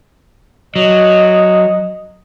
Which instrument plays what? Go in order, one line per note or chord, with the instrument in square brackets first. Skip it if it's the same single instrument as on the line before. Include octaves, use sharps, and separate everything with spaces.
[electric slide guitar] F#3 [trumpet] D#5